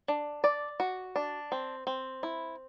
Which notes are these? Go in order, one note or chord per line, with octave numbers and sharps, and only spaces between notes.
D4
D5
F#4
D4
C4
C4
E4